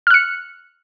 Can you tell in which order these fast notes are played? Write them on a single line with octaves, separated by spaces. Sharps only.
F6 F#6 C#7